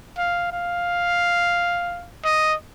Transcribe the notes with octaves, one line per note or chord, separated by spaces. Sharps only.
F5
F5
D#5